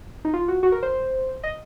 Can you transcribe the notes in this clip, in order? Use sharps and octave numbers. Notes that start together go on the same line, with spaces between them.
D#4
F4
F#4
F#4
A#4
C5
D#5